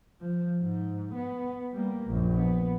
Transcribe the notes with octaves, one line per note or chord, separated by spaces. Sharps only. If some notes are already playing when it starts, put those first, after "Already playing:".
F3
G#2
B3
G3 A#3
A#1 F#2
B3